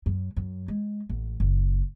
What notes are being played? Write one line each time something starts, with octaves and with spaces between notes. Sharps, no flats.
F#2
F#2
G#3
A1
F#1